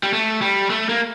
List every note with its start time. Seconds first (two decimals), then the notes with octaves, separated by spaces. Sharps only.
0.03 G3
0.13 A3
0.41 G3
0.70 A3
0.89 A#3